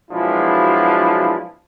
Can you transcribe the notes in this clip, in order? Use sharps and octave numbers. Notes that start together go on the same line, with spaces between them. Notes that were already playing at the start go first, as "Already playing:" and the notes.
B2 F3 F#3 G#3 D4 E4